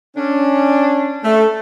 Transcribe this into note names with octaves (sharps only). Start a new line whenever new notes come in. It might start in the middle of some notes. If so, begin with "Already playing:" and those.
C#4 D4
A3